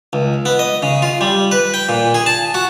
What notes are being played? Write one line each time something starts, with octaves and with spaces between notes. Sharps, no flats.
C#2
B3
D#5
C#3
F4
G3
B4
G5
A#2
G#4
A5
F#4